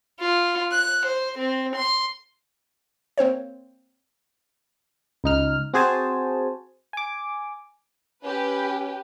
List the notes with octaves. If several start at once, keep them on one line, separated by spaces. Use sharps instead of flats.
F4
F#6
C5
C4
C6
A#3 C4 C5 C#5
C#2 D#4 F6
C4 F#4 G#4 C5 G#5 A5
G#5 D6
C#4 G4 B4